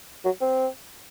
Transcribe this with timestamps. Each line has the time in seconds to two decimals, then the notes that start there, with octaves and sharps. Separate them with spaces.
0.25 F#3
0.41 C4